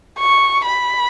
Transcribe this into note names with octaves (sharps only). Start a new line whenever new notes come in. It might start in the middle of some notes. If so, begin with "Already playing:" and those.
C#6
B5